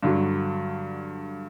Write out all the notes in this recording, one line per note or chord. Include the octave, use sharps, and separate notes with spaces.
G2 D3 F#3